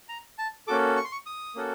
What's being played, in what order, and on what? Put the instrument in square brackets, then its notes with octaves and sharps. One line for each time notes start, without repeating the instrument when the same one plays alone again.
[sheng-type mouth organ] A#5
A5
A#3 C#4 F#4 A4 D6
C#6
C6
C#6
D#6
A#3 C#4 F#4 A4